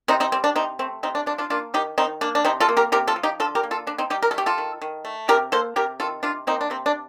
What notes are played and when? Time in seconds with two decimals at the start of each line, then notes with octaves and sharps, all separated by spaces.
0.08 C3 C4 D#4
0.20 C4 D#4
0.32 G3 C4
0.44 D4
0.56 C3 C4 D#4
0.79 A3 C4
1.03 C3 C4 D#4
1.15 D4
1.26 F3 D4
1.38 D4 F4
1.50 A#3 D4 F4
1.74 D#3 D#4 G4
1.98 D#3 C4 D#4
2.21 A#3 D4
2.35 D4
2.45 C3 C4 D#4
2.60 F4 A4
2.69 A#3
2.77 G4 A#4
2.92 C3 G4 A#4
3.07 F4 A4
3.16 F3
3.23 D#4 G4
3.40 D3 F4 A4
3.55 G4 A#4
3.63 A#3
3.71 F4 A4
3.87 D3 D4
3.98 C4 D#4
4.10 G3 D#4 G4
4.23 A#4
4.31 A4
4.34 A3 G4
4.46 F4 A4
4.58 D#3
4.82 D#3
5.05 A3
5.28 C3 G4 A#4
5.52 A#3 A4 C5
5.76 C3 G4 A#4
6.00 D#3 F4 A4
6.23 C3 D4 F4
6.47 A#3 C4 D#4
6.61 D4
6.70 C3 C4
6.86 D4